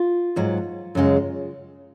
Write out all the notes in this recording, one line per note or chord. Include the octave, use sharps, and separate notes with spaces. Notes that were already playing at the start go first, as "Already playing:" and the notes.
Already playing: F4
G#2 F#3
F#2 C#3 G#3